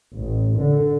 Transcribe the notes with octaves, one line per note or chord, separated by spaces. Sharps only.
A1
D3